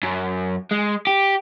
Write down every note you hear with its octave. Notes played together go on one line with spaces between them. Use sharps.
F#2
G#3
G4